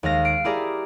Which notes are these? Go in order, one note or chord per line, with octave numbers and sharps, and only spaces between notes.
D#2 G#3 F5 A#6
C7 D7
E4 G4 G#4 A#4 D5 A#5